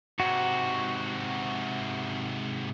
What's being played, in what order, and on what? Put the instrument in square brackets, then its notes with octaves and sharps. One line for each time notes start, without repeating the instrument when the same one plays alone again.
[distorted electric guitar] G#2 C3 [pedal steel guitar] F#4